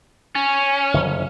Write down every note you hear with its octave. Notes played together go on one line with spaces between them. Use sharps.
C#4
F#1 D3 F3